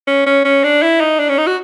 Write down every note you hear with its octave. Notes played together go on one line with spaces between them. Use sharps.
C#4
C#4
C#4
D4
E4
D#4
D4
C#4
D#4
F#4